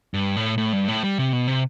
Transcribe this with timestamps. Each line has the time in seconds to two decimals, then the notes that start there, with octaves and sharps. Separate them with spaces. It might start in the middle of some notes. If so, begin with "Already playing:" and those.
0.14 G2
0.37 A2
0.58 A2
0.73 G2
0.88 A2
1.04 G3
1.18 C3
1.33 B2
1.48 C3